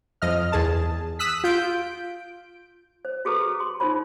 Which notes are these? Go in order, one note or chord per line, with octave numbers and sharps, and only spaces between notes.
F2 D#5 F6
E2 G#4 A5
D#6 E6 F#6 B6
F4 G6 D7
C5
F#4 G#4 A4 B4 A#5
G#4
C6
D#4 F4 A#4 C5 B5